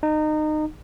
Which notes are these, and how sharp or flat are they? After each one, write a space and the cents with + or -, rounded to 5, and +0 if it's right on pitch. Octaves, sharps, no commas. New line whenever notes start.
D#4 -25